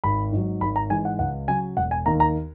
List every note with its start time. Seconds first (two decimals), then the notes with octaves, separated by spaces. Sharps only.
0.04 G#1 B5
0.32 G#2 F#3
0.61 G#1 B5
0.76 A#5
0.90 G#2 E3 G#3 G#5
1.05 F#5
1.19 C#2 F#5
1.48 C#3 F#3 G#5
1.77 E1 F#5
1.91 G#5
2.06 D#2 D#3 A#5
2.20 A#5